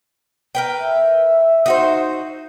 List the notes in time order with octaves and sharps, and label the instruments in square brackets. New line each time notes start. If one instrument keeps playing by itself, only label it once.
[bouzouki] A#4 B4 G5
[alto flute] E5
[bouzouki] D#4 F#4 C5